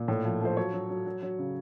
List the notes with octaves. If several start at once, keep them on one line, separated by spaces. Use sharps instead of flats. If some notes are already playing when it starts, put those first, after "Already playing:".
Already playing: A#2
A2
F3
F3 C5
F#3 C#5
F#3
F#3
F#3
F#3
C#3